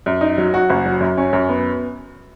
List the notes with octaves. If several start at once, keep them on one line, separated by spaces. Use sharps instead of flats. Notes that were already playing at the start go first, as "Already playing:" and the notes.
F#2
D#4
F#3
F#4
F#1
F#3
F#2
C#4
F#2
B3